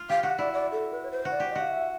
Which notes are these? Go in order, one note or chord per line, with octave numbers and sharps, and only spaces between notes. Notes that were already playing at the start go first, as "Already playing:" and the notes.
Already playing: F4
G4 F5
F#4 F#5
E4 D5
D5
A4
B4
C#5
C5
F#4
D5
G4
D#5
F#4
F5
E5